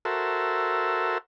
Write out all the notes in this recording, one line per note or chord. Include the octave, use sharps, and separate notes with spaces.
F#4 A4 A#4 C5 E5